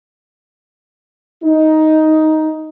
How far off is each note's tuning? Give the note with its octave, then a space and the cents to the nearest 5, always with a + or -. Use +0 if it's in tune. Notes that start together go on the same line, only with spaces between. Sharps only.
D#4 +10